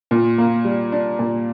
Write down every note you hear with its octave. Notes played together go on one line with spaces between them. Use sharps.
A#2
A#3
G3
D4
A#2